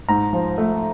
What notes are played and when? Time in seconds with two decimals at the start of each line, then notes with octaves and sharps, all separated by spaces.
0.09 G#2 A#5
0.33 F3
0.58 A3